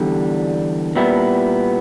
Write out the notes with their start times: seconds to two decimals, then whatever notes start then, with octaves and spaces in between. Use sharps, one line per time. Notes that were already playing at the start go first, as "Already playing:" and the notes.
Already playing: E2 D3 G3
0.96 A#2 G3 B3 E4